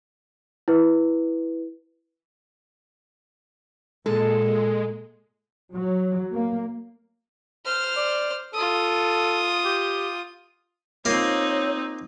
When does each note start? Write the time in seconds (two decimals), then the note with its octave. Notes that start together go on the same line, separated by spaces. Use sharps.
0.68 E4 B4
4.06 A#2 G#3 A4
5.73 F#3
6.33 A#3
7.65 C5 F6
7.97 D5
8.53 F4 A4 D#6
9.65 G4
11.05 A#3 C4 D#4 F4 C#5